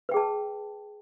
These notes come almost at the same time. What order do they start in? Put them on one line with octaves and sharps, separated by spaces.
B4 G5 G#4 A5